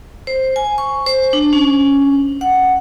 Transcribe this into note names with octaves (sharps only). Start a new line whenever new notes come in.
C5
G#5
C#6
C5
D4
C#4
F#5